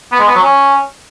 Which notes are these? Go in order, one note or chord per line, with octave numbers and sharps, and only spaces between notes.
B3
G#3
B3
F#3
C#4